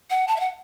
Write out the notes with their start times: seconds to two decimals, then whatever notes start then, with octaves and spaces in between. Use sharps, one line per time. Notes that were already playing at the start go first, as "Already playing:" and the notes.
0.10 F#5
0.28 A5
0.36 E5
0.40 F#5